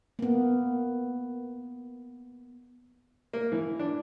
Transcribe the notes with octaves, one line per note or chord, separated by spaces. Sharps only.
A#3 B3
A#3
E3
D4